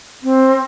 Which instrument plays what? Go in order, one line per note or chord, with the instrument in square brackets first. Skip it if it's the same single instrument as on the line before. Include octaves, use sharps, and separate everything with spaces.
[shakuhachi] C4